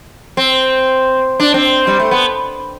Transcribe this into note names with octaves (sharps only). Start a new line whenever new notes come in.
C4
D4
C4
G3
A3
B3